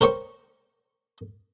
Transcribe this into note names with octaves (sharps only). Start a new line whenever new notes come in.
A#4 C5 C#5 G5 C#6